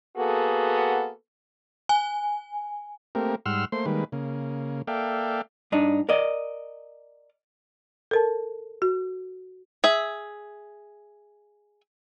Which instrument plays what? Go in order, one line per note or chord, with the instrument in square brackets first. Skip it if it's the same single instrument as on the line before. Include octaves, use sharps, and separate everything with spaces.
[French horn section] A#3 B3 F#4 G#4 A4
[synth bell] G#5
[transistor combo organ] A3 A#3 C4 G4 A#4
G#2 G3 F#5 C6 E6 F6
A3 A#3 C5 C6
D#3 G3 G#3 A#3 B4
C#3 A#3
A#3 A4 D5 E5 F5 G5
[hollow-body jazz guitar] G2 D4 D#4
A#4 D5 D#5
[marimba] A4 A#4 A5
F#4
[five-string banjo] G#4 E5